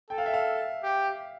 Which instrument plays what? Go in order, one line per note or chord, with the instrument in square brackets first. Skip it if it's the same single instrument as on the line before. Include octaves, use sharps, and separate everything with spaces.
[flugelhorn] A4 [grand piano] G5
[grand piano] F5
E5
F5
[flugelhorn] G4